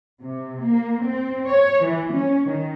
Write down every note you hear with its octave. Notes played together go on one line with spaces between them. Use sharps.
C3
A#3
C4
C#5
E3
C#4
D#3